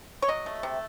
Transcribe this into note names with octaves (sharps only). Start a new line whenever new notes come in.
C#5
F#3 D#5
A3
C3